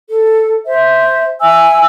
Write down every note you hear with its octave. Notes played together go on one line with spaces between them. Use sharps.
A4
C5 E5
E5 G#5 E6